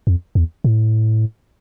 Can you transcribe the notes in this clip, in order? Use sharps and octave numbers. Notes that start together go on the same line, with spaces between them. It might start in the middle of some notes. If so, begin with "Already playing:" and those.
F2
E2
A2